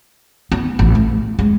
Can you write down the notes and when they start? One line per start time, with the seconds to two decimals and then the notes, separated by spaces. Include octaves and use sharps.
0.52 B3
0.79 A1
0.95 A3
1.39 G#3